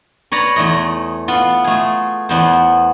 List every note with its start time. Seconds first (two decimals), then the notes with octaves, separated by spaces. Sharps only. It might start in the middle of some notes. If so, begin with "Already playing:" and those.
0.32 B4 C#5 D5 A#5
0.56 E2 A3 D#5
1.28 B3 F4
1.64 A3 G#4
2.29 E2 B3 C5